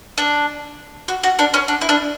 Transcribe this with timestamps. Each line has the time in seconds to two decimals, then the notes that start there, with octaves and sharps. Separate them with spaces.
0.18 D4
1.08 F#4
1.23 F#4
1.39 D4
1.54 C#4
1.68 D4
1.81 E4
1.89 D4